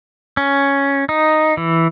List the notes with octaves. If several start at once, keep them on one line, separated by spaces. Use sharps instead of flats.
C#4
D#4
E3